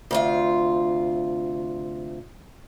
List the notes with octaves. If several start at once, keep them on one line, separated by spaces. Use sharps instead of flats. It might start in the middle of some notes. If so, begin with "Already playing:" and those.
D2 C3 F4